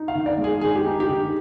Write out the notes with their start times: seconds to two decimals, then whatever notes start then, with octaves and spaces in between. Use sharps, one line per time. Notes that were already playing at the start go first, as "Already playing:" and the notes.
Already playing: D#4
0.08 F5
0.15 D#3
0.26 D5
0.38 G#3
0.44 G#4
0.61 D#3 G#4
0.75 G4
0.86 D#4
1.00 G4
1.09 D#3